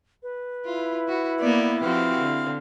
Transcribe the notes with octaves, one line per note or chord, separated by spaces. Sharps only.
B4
E4 F4
F#4
A#3 B3 D5
F3 C4 F#4 G4 F5
D3